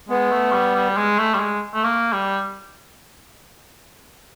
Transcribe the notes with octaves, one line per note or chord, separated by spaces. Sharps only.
G#3 B3
A3
G3
G3
G#3
A3
G3
G#3
A3
A#3
G3